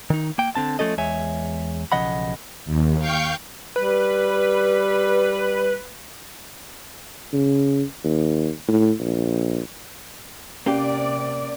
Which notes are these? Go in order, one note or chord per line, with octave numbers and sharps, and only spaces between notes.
D#3 D#4
A#3 G5
D3 C4 A5
F3 A3 C#4 A4 D#5
E2 G#3 C#5 E5 G#5
B1 C#3 F3 D#5 F#5 B5
D#2
F5 G5 C#6 G6
G3 B4
C#3
D#2
A2
A#1
C3 A#3 C#4 G4 D5